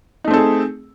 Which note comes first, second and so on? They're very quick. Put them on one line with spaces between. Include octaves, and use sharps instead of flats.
D#4 A3 C4 A4 G#4